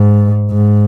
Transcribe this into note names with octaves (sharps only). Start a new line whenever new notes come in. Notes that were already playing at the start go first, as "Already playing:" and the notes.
Already playing: G#2
G#2